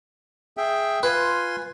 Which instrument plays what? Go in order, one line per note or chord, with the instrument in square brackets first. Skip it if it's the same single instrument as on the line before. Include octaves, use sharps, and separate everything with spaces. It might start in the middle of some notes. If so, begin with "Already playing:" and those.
[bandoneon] G#4 E5 G5
[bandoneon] F4 G#5 C6 [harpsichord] B4